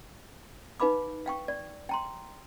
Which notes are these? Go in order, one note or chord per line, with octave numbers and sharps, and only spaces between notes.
D#4 B4 F5 B5 D6
F5 G5 C#6
D5
G5 A#5 C6